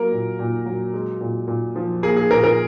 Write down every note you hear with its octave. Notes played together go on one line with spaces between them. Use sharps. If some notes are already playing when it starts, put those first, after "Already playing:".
Already playing: F#3 A#3 A#4
A#2
A#2
F#3
G#3
A#2
A#2
F3
A#3 G#4
G#4
A#2 A#4
A#4